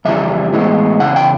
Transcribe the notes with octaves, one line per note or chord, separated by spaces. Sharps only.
F2 C#3 E3 G3 E5
A2 E3 G#3 B3
E2 C#3 F#5
G5